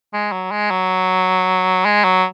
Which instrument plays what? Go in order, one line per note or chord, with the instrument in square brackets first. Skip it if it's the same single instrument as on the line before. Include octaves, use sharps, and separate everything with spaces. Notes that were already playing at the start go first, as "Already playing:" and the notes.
[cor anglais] G#3
F#3
G#3
F#3
G#3
F#3